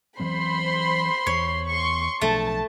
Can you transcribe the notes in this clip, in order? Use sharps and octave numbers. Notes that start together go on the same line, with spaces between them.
E3 F#3 C4 C5 B5 C6
E2 C#5
C6 C#6
B1 F3 A3 D4 A5